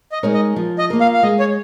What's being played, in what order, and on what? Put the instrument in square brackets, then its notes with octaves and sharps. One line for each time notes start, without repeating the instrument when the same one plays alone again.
[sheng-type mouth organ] D#5
[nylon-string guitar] G#3 D#4 A#4 C#5
[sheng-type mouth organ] D#5
[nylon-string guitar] F3
[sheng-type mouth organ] D#5
[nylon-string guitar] A#3 F4 A#4
[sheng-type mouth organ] F5
F5
[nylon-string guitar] G#3 [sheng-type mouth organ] D#5
[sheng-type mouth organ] C#5